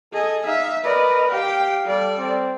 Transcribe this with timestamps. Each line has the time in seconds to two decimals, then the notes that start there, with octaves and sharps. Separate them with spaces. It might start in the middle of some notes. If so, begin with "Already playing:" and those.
0.13 G#4 A4 D#5
0.46 D#4 E5 F5
0.85 A#4 B4 D5 D#5
1.31 G4 F5 G5
1.84 G3 A4 D5
2.18 C4